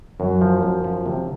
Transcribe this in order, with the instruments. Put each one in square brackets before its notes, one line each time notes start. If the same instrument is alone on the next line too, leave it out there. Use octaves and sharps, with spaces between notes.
[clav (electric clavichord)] F#2 [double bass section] F#3
[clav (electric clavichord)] F3
F#2
F3
C3